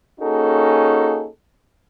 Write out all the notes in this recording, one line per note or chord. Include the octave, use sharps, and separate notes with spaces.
A#3 C#4 D#4 F#4 G#4 A4